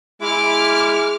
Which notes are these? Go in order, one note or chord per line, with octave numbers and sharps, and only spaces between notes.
G#3 E4 D6 F6